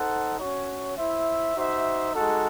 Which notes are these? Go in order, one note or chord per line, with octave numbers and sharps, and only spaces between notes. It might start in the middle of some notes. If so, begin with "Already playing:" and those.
Already playing: D#4 A4 C5 F#5
C#4 F#4 C#5
E4 C5 E5
D#4 F#4 C5 E5
G#3 D#4 F#4 A4